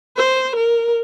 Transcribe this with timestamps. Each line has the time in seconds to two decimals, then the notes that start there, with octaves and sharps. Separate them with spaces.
0.17 C5
0.56 A#4